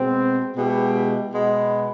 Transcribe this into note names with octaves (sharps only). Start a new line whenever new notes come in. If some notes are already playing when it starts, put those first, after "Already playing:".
Already playing: B2 G#3 C4
B2 G#3 B3 E4 G4
B2 G#3 B3